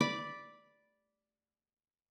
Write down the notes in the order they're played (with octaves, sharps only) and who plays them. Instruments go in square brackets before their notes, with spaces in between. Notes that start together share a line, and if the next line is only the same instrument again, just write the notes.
[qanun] D5 B5 D6